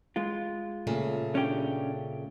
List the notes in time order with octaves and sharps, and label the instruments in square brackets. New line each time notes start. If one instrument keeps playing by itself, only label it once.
[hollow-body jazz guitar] G#3 F4
[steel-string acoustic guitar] A#2 C#3 A3
[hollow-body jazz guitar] C#4 D4 G4